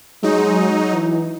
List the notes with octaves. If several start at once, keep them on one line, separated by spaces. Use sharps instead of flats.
F#3 G#3 D#4
E3